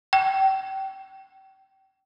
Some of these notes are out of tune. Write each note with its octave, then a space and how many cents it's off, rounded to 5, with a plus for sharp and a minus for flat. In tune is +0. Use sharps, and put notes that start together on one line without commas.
G5 -30